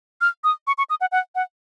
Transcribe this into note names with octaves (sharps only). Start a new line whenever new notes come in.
F6
D#6
C#6
C#6
D#6
F#5
F#5
F#5